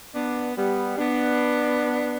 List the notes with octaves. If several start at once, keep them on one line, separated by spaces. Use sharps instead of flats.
B3 D4
G3 B3
B3 D4